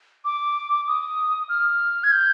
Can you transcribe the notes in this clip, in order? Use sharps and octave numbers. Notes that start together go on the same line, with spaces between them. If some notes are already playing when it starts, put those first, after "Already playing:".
D6
D#6
F6
G#6
G6